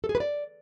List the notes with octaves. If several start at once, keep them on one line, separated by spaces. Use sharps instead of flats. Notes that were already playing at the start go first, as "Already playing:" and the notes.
A4
G#4
B4
D5